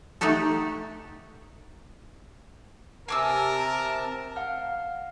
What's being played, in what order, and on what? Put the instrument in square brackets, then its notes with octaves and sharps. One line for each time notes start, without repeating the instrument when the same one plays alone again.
[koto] A3 D#4 F#4 G4 A4
[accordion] C3 A5 [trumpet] A#4 [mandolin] G#5 D6 E6
[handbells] F5 F#5 F6